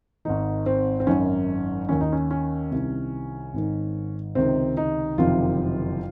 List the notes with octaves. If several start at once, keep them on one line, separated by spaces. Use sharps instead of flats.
G#1 G#2 D#3 D#4
C4
C4
G#1 F#2 D#3 C#4
D#2 D#3 C#4
D#4
C#4
C#4
C2 C3 D#3
G#1 G#2 D#3
C#2 C3 D#3 C4
D#4
F#1 F2 C3 D#3 F4